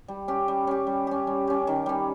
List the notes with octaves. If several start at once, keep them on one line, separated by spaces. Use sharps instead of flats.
G3
C#4 G4
G3
C#4 G4
G3
C#4 G4
G3
C#4 G4
D#3
G3 C#4